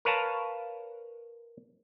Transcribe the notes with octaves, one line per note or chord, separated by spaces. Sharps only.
A#4 B4 C#5 F5 A5 A#5